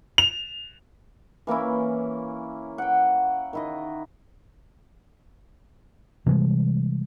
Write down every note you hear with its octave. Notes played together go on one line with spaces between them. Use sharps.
F7
E3 A#3 C#4 E4
F#5 G5
D#3 E4 D#5
C3 E3 G3 G#3